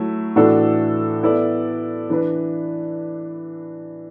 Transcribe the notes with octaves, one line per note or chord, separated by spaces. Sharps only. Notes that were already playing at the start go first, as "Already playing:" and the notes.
Already playing: F#3 A3 E4
A2 E3 D4 F#4 A4
B3 E4 A4 D5
E3 D4 B4 D5